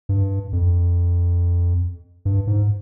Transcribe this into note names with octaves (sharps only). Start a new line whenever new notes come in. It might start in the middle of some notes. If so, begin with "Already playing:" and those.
G2
F2
G2
G#2